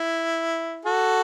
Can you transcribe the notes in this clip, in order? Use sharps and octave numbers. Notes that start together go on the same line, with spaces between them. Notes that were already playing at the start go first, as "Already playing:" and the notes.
Already playing: E4
F#4 A4